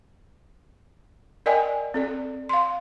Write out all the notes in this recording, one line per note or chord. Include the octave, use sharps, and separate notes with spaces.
A#4 D5 D#5 G5 G#5
C4 A4 D5
F5 C6